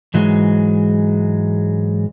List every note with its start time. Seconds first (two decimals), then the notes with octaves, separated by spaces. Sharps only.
0.14 G#2 E3 F#3 G#3